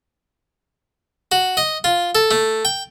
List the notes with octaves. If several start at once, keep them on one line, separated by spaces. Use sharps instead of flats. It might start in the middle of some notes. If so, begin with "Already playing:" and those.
F#4
D#5
F4
A4
A3
G5